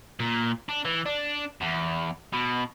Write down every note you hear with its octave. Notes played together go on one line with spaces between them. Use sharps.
A#2
D4
E3
D4
E2
B2